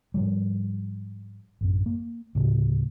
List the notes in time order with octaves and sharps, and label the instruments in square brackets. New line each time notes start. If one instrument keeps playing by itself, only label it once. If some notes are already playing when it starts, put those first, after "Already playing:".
[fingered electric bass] G#2 F3 G3
A1 F#2
A#3
D2 A2 C#3